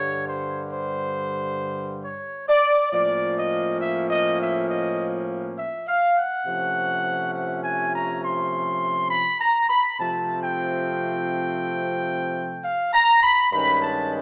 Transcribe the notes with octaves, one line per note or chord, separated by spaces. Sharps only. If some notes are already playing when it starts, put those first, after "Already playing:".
Already playing: G2 D3 G3 C#5
C5
C5
C#5
D5
A2 F3 A#3 C#4 D5
D#5
E5
D#5
E5
D#5
E5
F5
F#5
C3 F3 A3 C#4
F#5
G#5
A#5
C6
B5
A#5
B5
C3 F3 A3 C4 A5
G5
F5
A#5
B5
G2 D#3 G#3 C#4 B5
A5